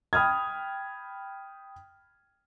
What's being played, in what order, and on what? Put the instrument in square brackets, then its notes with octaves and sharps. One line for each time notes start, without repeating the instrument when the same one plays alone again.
[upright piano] G5 B5 D#6 F6 G#6